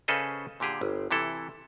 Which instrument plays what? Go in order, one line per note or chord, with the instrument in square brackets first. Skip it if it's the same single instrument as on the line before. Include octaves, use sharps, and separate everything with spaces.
[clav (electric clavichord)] C#3 C#4 A4 B4 C5 D#5
A#2 D3 G4 G#4
G1
C3 E3 E4 A4